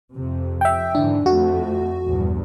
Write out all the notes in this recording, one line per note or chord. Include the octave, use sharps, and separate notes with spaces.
F2 C3
E5 G5
G#2 D3 E3 D4
F2 A3 F#4
A#1 E2 G2